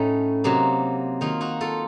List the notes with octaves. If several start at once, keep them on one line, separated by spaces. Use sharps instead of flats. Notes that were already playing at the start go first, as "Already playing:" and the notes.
Already playing: A2 A3 C#4 D#4
C3 F#3 A#3 D#4
D#3 A#3 D#4 F4
D#4 F#4
F4 A4